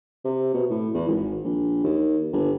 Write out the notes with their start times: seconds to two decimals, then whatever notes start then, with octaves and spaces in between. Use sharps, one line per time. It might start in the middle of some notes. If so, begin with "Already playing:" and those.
0.25 C3
0.54 B2
0.70 A2
0.94 E2
1.09 G#1
1.44 A#1
1.83 D#2
2.33 G1